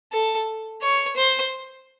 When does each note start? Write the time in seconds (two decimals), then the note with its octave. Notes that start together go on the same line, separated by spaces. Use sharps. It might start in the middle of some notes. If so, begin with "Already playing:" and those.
0.12 A4
0.82 C#5
1.16 C5